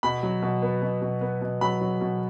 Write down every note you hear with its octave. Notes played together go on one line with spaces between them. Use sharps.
B2 B5
F#3
B2
B3
B2
B2
B3
B2
F#3 B5
F#3
B2